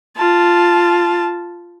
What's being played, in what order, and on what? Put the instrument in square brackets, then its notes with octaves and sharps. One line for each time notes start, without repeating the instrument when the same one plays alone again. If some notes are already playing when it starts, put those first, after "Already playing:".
[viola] F4 A5